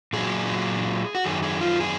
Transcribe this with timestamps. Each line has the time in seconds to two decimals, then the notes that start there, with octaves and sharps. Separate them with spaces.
0.13 A#2 F#3 G#4
1.15 F#4
1.24 F#2 D#3 F#3 G#4
1.43 G#4
1.61 F4
1.80 G#4